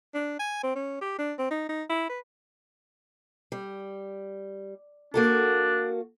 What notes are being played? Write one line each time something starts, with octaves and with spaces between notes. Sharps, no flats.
D4
G#5
C4
C#4
G4
D4
C4
D#4
D#4
E4
B4
G3
A#3 D4 F#4 A4